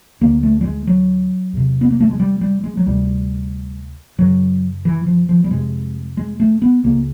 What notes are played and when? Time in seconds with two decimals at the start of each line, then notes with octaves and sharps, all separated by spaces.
0.21 D2 D3 A#3
0.43 A3
0.61 G3
0.65 G#3
0.87 F#3
1.53 E2 C3
1.81 B3
1.90 A#3
2.00 A3
2.11 G#3
2.20 G3
2.41 G3
2.64 G#3
2.77 F#3
2.86 D2 C3 G3
4.18 F#2 C#3 F#3
4.85 E3
5.06 F3
5.29 F3
5.44 G3
5.50 F2 C3 G#3
6.17 G#3
6.40 A3
6.62 B3
6.83 C#2 C#3 A#3